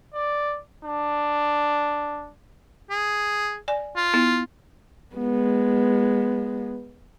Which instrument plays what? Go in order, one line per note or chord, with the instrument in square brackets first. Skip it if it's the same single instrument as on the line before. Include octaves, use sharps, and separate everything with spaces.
[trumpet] D5
D4
[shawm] G#4
[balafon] D5 G#5
[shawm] F4
[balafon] B3 E4
[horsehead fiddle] G#3 B3